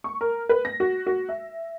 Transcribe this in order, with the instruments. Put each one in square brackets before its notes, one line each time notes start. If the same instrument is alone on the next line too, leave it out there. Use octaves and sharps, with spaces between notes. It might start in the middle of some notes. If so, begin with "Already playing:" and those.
[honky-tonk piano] C#6
A#4
B4
A#6
F#4
F#4
E5